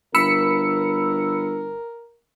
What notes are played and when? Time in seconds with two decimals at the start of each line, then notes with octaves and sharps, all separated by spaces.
0.15 G1 A#4 B5 E6 C#7